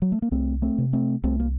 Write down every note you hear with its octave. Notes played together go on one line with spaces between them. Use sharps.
F#3
A3
A#3
C2 A3 C4
A3 C4
C3
A3 C4
C2 A3 C4
A#3